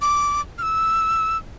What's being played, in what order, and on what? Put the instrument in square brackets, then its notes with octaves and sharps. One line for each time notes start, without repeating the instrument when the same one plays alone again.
[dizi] D6
F6
E6